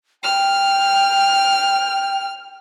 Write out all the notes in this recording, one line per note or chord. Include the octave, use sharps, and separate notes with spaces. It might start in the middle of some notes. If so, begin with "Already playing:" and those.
G5 F6